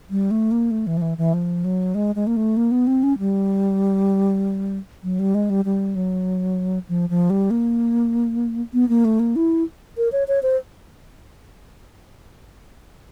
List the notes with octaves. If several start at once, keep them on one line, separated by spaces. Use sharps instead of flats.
G3
A3
A#3
A3
E3
F3
E3
E3
F3
F#3
G#3
G#3
A#3
A3
A#3
B3
C4
C#4
G3
F#3
G3
G#3
G3
G3
F#3
F3
F3
G3
A#3
B3
A#3
A3
A#3
E4
A#4
C#5
C#5
C5